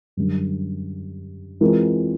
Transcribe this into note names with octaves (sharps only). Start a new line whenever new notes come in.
F#2 D3 G3
E3 G#3 C4 F4 A#4